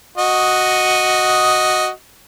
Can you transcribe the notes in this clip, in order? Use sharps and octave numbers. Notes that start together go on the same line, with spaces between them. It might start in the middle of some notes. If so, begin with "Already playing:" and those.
F#4 D#5